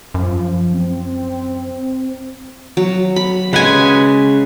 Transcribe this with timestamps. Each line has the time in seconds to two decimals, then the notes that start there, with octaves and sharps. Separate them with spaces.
0.14 F#2 F3
0.74 C4
2.77 F#3
3.16 B5
3.53 C#3 G#3 B4 F#5 G#5